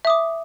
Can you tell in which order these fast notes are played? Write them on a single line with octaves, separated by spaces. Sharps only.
E5 D#6 D6